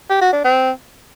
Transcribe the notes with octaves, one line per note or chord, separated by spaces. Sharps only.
G4
F#4
D4
C4